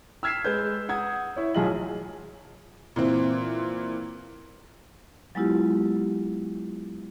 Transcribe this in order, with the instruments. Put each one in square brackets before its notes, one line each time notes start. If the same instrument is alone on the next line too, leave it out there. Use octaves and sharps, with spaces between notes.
[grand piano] E6 F6 G#6 B6 C7 E7
G#3 B4 G6
F#5 D#6 G#6
E4 C#5
B1 F#3 F4 G#4 D#5 F#7
[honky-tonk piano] A#2 E3 C4
[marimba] F#3 G#3 B3 E4 F4 G4